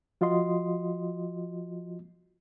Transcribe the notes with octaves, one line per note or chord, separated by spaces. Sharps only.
F3 F4 F#4 D#5 C6